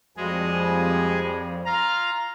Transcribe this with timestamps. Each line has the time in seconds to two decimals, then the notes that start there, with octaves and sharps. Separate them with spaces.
0.17 F2 F3 G3 G#3 F#4 G#4
0.53 G#5
1.66 F4 F5 A#5